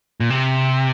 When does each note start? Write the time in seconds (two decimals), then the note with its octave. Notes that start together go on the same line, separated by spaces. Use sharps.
0.20 A#2
0.30 C3